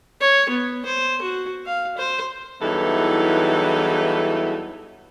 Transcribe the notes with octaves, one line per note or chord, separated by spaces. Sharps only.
C#5
B3
C5
F#4
F5
C5
E2 G2 E3 F#3 D#4 A4